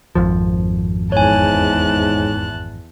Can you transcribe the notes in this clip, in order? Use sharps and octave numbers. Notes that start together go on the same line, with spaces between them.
G#1 F2 F3
E2 G#2 C#5 G#5 A5 F#6